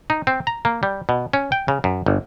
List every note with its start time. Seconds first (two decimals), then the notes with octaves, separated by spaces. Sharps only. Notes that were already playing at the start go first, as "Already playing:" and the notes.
0.10 D#4
0.27 C4
0.47 A#5
0.65 A#3
0.83 G3
1.09 B2
1.33 C#4
1.52 G5
1.68 C#3
1.84 F#2
2.06 G1